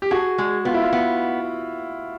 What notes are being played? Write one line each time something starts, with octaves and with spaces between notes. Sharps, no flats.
G4
F#4 G#4
G#3
B3 F4
E4
F4
B3